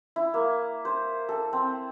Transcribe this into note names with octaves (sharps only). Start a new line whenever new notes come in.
E4
A#3
C5
A4
C4